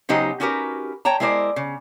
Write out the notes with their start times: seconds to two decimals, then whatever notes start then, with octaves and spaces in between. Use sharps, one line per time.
0.09 C#3 F#3 D#4 G4 C5 D#5
0.40 C#4 D#4 F#4 G4 A#4 B4
1.05 C#5 G5 A5 A#5
1.20 G#3 E4 A#4 C5 D5
1.56 C#3